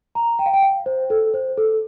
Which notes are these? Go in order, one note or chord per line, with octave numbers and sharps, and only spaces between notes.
A#5
G5
F5
G5
F5
C5
A4
C5
A4